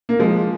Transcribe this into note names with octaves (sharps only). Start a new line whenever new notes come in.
A#3
F3 G#3